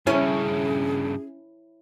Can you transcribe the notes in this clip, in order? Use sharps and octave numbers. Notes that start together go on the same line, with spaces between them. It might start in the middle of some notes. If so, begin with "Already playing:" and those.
G2 C#3 C#4 E4 G#4